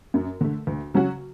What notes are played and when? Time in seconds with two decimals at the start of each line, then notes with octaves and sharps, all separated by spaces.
0.14 F#2
0.41 D3 A3
0.67 D2
0.94 C#3 F#3 C#4 F#4